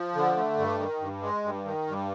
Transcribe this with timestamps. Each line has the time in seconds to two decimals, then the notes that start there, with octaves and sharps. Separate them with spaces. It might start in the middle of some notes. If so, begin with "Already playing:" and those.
Already playing: F3
0.15 D3
0.36 A3
0.58 G2
0.80 D#3
1.01 G2
1.22 G#3
1.44 G2
1.65 D#3
1.87 G2